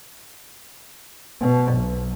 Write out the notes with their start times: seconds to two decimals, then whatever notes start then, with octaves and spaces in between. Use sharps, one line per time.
1.40 B2
1.73 B1